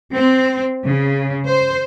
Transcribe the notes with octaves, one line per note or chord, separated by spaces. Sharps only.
C4
C#3
C5